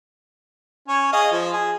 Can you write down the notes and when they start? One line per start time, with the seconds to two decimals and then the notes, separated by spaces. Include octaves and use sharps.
0.88 C#4 C#5
1.12 G#4 D#5 F5
1.32 F3 F4
1.53 G#4